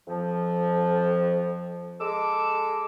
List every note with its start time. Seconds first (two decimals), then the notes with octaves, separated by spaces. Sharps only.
0.07 F2 F3
2.00 G#3 A4 D6 E6